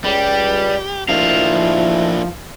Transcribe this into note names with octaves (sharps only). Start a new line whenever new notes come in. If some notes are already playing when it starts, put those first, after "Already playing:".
C#2 G3 G4
D2 D#3 F3 A#3 D4 E4 F5